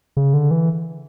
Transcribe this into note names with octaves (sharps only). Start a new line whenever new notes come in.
C#3
D3
E3